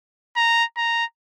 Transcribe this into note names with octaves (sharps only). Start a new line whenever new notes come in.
A#5
A#5